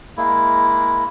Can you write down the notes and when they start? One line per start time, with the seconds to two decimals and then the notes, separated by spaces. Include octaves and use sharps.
0.17 G#3 A#3 E4